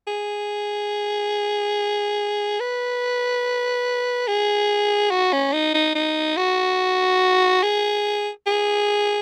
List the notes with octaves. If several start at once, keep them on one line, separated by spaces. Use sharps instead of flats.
G#4
B4
G#4
F#4
C#4
D#4
D#4
D#4
F#4
G#4
G#4